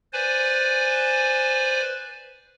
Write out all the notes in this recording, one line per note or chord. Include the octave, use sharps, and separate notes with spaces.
B4 C5 D5 G#5